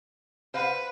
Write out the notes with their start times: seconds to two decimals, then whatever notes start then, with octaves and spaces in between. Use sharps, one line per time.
0.54 B4 C5 F5 F#5